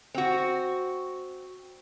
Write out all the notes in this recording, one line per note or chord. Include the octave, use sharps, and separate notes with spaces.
C4 F#4